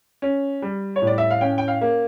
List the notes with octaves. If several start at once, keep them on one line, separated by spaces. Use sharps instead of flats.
C#4
G3
C#5
A2
D5
E5
F5
C#4 G5
G5
F5
A#3